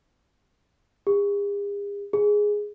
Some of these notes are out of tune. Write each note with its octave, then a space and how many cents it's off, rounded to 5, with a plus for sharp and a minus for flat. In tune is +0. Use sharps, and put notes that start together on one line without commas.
G#4 -45
G#4 +0